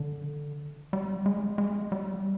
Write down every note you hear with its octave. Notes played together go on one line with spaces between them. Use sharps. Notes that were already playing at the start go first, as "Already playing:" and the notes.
Already playing: D3
G3
G#3
G#3
G3